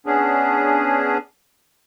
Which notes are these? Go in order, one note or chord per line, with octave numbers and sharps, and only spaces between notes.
B3 C#4 D4 G#4